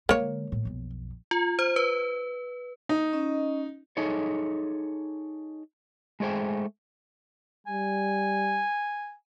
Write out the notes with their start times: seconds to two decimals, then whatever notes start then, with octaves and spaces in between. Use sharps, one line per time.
0.09 D3 G#3 A#3 C#5
0.52 A2
0.65 B1 F2
1.31 F4
1.59 C5
1.76 B4
2.89 D#4
3.13 C#4 D#5
3.97 D#4 G#4 A4 C#5
6.20 G#3 A3 G#4 C5 G5
7.67 G3 G#5